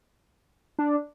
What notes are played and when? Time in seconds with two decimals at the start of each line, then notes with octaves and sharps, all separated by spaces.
0.79 D4